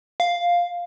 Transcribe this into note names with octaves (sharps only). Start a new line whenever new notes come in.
F5